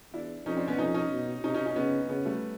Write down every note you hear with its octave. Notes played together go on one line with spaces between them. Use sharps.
E2 D4 E4
F2 C#4 D#4
C4 D4
B3 C#4
F2 C#4 D#4
C#4 D#4
B2
C3 C#4 D#4
C#4 D#4
C#4 D#4
C#3 B3 C#4
C#3 B3 C#4
G3 A3